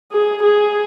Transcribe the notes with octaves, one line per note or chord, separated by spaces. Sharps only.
G#4
G#4